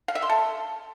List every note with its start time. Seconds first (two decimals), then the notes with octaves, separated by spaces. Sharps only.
0.08 F5
0.15 E5
0.22 C6
0.29 A4